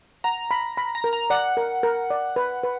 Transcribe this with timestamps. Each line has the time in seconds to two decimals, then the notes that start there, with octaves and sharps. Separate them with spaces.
0.24 F#5 A#5
0.51 B5
0.77 B5
0.95 A#5
1.04 A#4
1.13 A#5
1.30 D5 F#5
1.57 A#4
1.83 A#4
2.10 D5
2.36 B4
2.63 B4